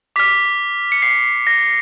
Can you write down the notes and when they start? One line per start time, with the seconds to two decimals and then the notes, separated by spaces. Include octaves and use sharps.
0.16 D6 F6 B6
0.92 C#7
1.02 C7
1.47 A#6